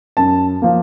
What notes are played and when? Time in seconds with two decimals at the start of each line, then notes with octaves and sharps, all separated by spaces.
0.17 F#2 A5
0.62 F3 A#3